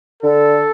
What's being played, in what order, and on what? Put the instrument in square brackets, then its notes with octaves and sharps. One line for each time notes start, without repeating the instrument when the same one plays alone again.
[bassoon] D3 [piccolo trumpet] A4